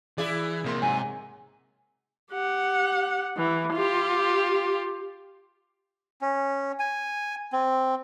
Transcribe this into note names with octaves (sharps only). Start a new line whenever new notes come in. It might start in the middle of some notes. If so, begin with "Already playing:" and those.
E3 E4 G#4 D5 E5
A#1 C3 A#3 C6
G#2 F#3 G#5
G4 F#5
E3
F4 G4
C#4
G#5
C4